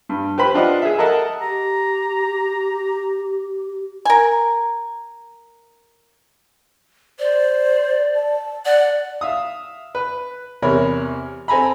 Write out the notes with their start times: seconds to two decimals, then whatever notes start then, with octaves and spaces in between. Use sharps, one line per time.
0.09 G2
0.38 G4 B4 C5 B5
0.54 D4 F4 D#5 F#5
0.82 G#4 E5
0.98 A4 A#4 D#5 F#5 A5
1.42 G4 A#5
4.05 A#4 G#5
7.19 C5 D5
8.15 A5
8.65 D5 F#5
9.21 E5 F5 D#6
9.95 B4
10.62 E2 C3 A#4 C#5 B5
11.48 C4 A4 G#5 A#5 B5